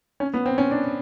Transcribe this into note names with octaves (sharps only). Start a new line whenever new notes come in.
C#4
B3
C4
C#4
D4